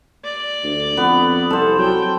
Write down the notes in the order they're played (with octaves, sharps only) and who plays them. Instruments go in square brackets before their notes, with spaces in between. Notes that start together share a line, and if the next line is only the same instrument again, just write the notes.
[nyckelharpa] D5
[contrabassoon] D2
[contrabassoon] F2 [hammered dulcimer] B3
[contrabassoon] C2 [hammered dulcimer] A4 C5
[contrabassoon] F#3 [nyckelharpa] G5